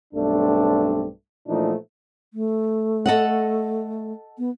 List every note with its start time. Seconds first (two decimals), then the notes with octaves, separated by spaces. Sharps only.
0.14 B1 G2 A3 C4 D4
1.47 A#2 E3 F3 A3 D4 D#4
2.34 A3
3.06 A4 D#5 F#5
4.39 B3